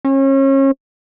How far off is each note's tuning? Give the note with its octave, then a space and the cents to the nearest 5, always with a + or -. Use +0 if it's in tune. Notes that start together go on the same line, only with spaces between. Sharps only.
C#4 -35